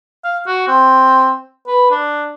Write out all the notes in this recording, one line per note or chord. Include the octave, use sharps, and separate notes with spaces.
F5
F#4
C4
B4
D4